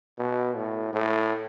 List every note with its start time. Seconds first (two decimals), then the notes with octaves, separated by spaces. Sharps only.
0.18 B2
0.56 A2
0.93 A2